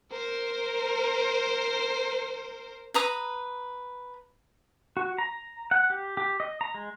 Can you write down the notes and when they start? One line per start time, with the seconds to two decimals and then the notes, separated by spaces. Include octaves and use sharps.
0.12 A#4 C5
2.94 B4 A#5 D#6
4.97 F#4
5.18 A#5
5.71 F#5
5.90 G4
6.17 G4
6.40 D#5
6.61 A#5
6.74 G#3